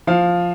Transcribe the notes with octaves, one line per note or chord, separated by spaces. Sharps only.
F3 F5